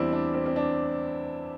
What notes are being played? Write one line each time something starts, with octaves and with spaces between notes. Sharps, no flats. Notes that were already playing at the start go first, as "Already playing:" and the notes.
Already playing: E2 E3 G3 C4 D4 E4
D4
C4
C4
D4